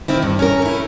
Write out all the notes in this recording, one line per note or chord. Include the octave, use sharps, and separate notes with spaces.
D#3 C4 E4
G2
C#4 A#4
A3 E4